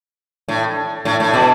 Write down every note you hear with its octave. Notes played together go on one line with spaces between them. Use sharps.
A2
A2
A2
B2